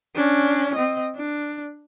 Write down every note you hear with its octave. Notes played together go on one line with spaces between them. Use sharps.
C#4 D4
C4 D#5
D4